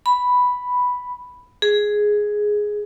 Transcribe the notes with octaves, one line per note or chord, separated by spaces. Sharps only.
B5
G#4